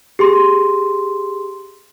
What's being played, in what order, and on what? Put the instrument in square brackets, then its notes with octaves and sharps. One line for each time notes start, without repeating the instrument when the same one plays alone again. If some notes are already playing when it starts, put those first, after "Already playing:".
[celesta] G4 G#4 C6